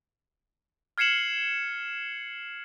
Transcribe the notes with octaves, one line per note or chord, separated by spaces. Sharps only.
F6 G#6 C7 C#7 E7 F#7